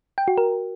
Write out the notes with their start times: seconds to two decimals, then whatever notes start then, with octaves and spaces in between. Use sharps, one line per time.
0.18 G5
0.28 F#4
0.38 A#4